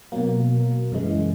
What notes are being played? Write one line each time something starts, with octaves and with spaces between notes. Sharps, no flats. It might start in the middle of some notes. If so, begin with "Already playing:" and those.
B2 F#3 A#3
F#2 C#3 E3 G#3